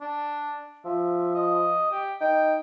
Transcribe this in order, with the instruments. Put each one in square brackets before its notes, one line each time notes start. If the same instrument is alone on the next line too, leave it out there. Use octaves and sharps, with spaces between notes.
[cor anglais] D4
[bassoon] F3 [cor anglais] E5
[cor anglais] D#5
G4
[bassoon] D#4 [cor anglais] G5